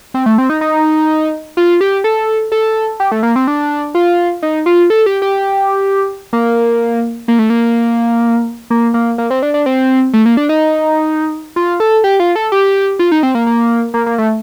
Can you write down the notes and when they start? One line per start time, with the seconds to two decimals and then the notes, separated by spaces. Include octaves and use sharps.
0.14 C4
0.26 A3
0.38 C4
0.50 D#4
0.61 D#4
1.57 F4
1.81 G4
2.04 A4
2.52 A4
3.00 G4
3.12 A3
3.23 A#3
3.36 C4
3.47 D4
3.95 F4
4.42 D#4
4.66 F4
4.90 A4
5.06 G4
5.22 G4
6.33 A#3
7.28 A#3
7.39 A3
7.50 A#3
8.70 A#3
8.94 A#3
9.18 A#3
9.30 C4
9.43 D4
9.54 D4
9.66 C4
10.13 A3
10.26 A#3
10.37 D4
10.49 D#4
11.56 F4
11.80 A4
12.04 G4
12.20 F4
12.36 A4
12.52 G4
12.99 F4
13.12 D#4
13.23 C4
13.35 A#3
13.47 A#3
13.94 A#3
14.06 A#3
14.18 A3